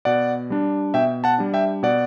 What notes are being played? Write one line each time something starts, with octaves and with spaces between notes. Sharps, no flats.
B2 D5 F#5
G3 D4
B2 E5 G5
F#5 A5
G3 D4
E5 G5
B2 D5 F#5